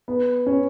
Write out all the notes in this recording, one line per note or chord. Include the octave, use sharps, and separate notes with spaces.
B3
C#4